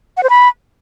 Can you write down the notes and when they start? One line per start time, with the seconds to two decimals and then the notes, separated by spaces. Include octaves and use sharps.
0.17 F#5
0.23 C5
0.30 B5